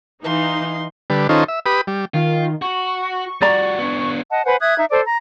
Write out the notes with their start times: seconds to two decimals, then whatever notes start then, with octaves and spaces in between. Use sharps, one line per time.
0.24 E3 D#4 F5 C6
1.10 D3 G3 B4
1.29 D#3 C#4 D#4 F4 A4 C5
1.48 E5
1.66 G4 B4 B5 D#6
1.87 G3
2.14 D#3 F4
2.62 F#4 C#6
3.42 G3 F#4 D5 A#5
3.79 B3 D4
4.30 D#5 F#5 A5
4.45 B4 C5 F#5 G#5
4.60 E5 D#6 F#6 G#6
4.77 D#4 E5
4.90 A4 C5 D5
5.05 A#5